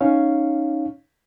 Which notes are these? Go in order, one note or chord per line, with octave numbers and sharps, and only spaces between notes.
C#4 D#4 C#5 F5